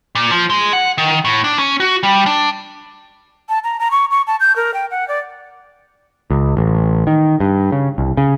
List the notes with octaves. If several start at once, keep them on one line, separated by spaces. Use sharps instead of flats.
A#2
F3
G#3
F#5
D#3
A2
D4
C#4
F#4
G3
D4
A5
A#5
A#5
C#6
C#6
A5
G6
A#4
G5
F#5
D5
C#2
A1
D#3
G2
C#3
C2
C#3